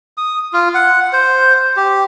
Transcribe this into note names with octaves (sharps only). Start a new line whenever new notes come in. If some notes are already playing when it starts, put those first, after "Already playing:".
D#6
F4
F#5
C5
G4